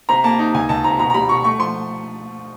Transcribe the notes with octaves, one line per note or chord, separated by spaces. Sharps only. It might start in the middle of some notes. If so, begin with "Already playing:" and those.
C3 A#5
A#3 A5
D#4
C#2 G#5
C#2 A5
C3 A#5
B2 A#5
A#5
G3 B5
B2 C#6
A3 C#6
F3 C6